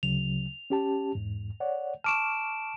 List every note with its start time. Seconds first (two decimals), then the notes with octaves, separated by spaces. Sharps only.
0.03 D2 C#3 F#3 F7
0.70 C#4 G4 A5
1.15 E2 G#2
1.60 C#5 D5 F#5
2.04 A5 C#6 D6 F6 D7 E7